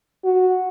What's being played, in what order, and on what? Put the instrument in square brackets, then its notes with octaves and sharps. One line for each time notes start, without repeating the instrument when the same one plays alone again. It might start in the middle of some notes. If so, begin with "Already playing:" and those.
[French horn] F#4